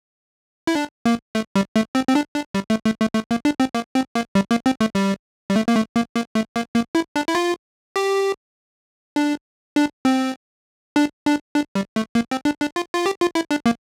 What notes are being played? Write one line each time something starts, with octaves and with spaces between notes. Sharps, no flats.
E4
D4
A#3
A3
G3
A3
C4
C4
D4
D4
G3
A3
A3
A3
A3
A#3
D4
C4
A#3
C4
A#3
G3
A#3
C4
A3
G3
G3
A3
A#3
A3
A#3
A#3
A3
A#3
A#3
E4
D4
E4
F4
G4
D4
D4
C4
D4
D4
D4
G3
A3
A#3
C4
D4
D4
F4
F4
G4
F4
E4
D4
A#3